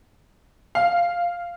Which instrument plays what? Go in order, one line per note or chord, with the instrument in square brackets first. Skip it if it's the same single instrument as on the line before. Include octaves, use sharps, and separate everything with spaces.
[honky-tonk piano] F5